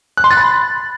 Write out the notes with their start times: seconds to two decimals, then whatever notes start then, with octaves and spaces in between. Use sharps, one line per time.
0.17 F#6
0.24 C6
0.31 A6
0.37 B5